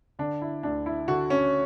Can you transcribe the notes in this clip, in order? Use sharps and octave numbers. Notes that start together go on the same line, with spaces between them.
D3 D4
E4
D2 D4
E4
D3 F#4
C#4